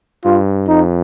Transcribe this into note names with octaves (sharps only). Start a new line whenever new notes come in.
G2 F4
F2 D#4